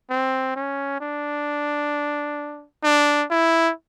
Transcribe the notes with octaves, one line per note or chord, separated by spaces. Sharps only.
C4
C#4
D4
D4
E4